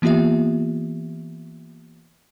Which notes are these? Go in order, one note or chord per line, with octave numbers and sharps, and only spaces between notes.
E3 A#3 B3 F4 G4 E5